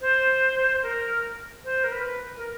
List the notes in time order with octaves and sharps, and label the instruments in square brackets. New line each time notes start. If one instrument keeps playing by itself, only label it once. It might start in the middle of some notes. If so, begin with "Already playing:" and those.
[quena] C5
A#4
C5
A#4
B4
A#4